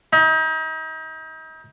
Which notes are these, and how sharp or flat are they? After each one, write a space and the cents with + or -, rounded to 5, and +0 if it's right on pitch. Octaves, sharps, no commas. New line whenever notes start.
D#4 +35